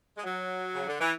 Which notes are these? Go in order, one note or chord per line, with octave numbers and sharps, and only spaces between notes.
G#3
F#3
C#3
D3
E3